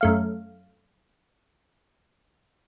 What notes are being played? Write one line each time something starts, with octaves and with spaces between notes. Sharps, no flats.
F#2 A3 F5